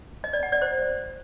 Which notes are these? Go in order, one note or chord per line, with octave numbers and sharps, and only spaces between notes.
D#5
D5
F#5
D5
C5